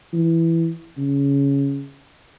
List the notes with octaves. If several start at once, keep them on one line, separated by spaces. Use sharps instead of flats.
E3
C#3